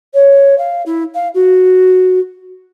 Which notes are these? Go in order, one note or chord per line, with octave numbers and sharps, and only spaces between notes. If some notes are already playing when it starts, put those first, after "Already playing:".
C#5
F5
E4
F5
F#4